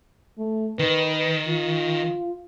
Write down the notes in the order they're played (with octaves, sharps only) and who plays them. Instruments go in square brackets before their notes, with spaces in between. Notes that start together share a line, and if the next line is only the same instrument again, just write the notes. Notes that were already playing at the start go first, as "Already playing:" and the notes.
[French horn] A3
[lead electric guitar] D#3 [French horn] B4
[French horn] F4